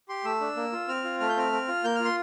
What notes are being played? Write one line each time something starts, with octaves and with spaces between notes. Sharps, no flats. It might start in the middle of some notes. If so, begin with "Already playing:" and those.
G4 C6
A3 E6
D4
A#3
F4
C4 F6
F4
A3 F6
G6
C4 F6
C4
F4
A#3 G6
F4 F6
C6